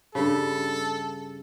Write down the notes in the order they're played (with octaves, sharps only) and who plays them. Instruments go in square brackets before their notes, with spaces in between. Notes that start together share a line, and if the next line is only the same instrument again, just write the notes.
[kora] G2 C#3 [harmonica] A4